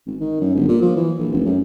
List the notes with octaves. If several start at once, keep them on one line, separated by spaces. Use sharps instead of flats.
G#1
D#3
F#2
G1
A#2
F3
E3
A#1
F1
F#2